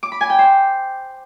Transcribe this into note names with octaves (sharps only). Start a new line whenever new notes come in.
D6
B5
G#5
G5
C5